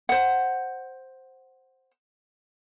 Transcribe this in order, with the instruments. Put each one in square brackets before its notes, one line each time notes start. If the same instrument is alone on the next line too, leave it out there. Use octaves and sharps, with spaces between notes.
[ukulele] C5 F#5